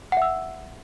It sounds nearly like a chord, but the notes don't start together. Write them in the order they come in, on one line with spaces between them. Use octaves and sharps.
F#5 E5 E6